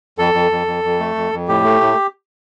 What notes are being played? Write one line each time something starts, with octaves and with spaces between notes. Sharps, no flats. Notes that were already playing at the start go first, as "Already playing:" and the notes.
F2 A4
F2
F2
F2
F2
A3
F2
F2
A2 G4
A3
A2